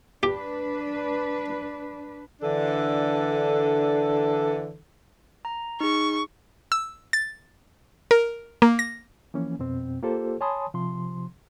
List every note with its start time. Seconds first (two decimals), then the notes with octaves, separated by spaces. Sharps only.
0.23 D4 G4 B4
2.41 D3 E3 D4 A4
5.45 A#5
5.80 D#4 G#4 C#6
6.72 E6
7.13 A6
8.11 A#4
8.62 A#3
8.79 A#6
9.34 E3 F3 A#3 C#4
9.59 F2 B2 C4
10.03 A#3 F4 G4 A4 C5
10.41 C#5 G#5 A5 B5 C6 D#6
10.74 C3 F3 C6